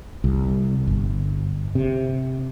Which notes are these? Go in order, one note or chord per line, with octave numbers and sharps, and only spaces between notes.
C2
G1
C3